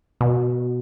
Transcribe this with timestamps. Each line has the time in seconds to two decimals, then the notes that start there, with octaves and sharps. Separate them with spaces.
0.21 B2